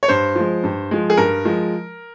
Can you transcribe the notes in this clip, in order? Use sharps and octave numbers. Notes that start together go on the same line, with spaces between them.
C#5
G2 C5
F3 G#3
G2
F3 G#3
G#4
G2 A#4
F3 G#3